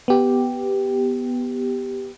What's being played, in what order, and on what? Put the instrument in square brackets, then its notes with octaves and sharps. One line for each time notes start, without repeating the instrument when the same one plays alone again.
[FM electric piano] B3 G4